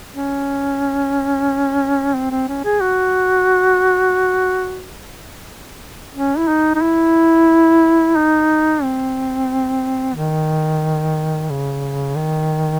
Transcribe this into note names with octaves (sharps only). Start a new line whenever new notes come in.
C#4
C4
C4
C#4
G#4
F#4
C#4
E4
D#4
D#4
E4
D#4
C4
D#3
C#3
D#3